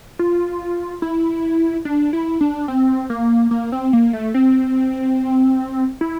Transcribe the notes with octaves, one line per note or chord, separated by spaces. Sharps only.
F4
E4
D4
E4
D4
C4
A#3
A#3
C4
A#3
A3
C4
E4